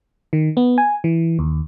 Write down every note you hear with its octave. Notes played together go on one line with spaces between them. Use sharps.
D#3
B3
G#5
E3
D#2